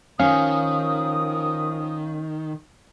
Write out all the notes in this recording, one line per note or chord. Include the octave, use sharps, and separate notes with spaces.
D#3 F3 C#4 A#4 F5 D#6